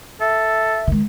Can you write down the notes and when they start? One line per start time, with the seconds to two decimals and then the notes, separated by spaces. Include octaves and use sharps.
0.20 A4 E5
0.87 D#3 G#3